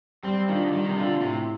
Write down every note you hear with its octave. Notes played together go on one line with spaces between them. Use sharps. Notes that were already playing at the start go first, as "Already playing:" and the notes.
G3 C4
D#3 D4 F4
D3
D#3 G3
C3
D3 D4 F4
A#2
A2 C3